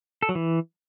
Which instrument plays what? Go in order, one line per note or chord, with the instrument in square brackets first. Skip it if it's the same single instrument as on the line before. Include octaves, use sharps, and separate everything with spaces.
[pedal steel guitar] A4
F#3
E3